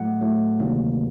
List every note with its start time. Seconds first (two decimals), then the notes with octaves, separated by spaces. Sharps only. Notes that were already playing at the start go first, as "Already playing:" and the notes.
Already playing: A2 F#3 A3 F#5
0.21 A2 F#3 A3
0.59 D2 C3 D#3 F#3 A#3